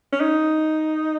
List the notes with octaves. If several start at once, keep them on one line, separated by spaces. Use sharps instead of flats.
C#4
D#4